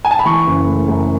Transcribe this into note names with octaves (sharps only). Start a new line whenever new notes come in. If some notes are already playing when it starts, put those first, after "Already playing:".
G#5
A5
B5
E3 C#6
F#1
A3
F#2